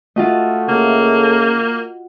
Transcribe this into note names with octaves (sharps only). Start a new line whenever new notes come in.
A3 F4 F#4 D#5
C#3 A#3